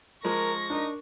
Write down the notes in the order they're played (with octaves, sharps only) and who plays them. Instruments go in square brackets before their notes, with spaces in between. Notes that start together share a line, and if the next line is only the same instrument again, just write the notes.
[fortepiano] F3 G#3 [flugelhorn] A#4 [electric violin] C#6 A#6
[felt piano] D4 A#4 [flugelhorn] D#4